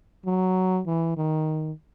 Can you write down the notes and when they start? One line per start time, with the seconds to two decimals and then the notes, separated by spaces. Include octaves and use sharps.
0.26 F#3
0.87 E3
1.17 D#3